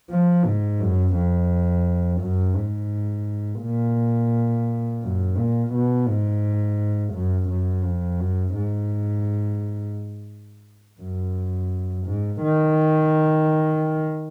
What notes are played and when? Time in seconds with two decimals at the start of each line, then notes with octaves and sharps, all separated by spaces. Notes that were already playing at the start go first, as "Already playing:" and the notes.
0.10 F3
0.45 G#2
0.80 F#2
1.16 F2
2.22 F#2
2.56 G#2
3.62 A#2
5.03 F#2
5.38 A#2
5.73 B2
6.08 G#2
7.14 F#2
7.49 F#2
7.85 F2
8.20 F#2
8.55 G#2
11.01 F#2
12.07 G#2
12.42 D#3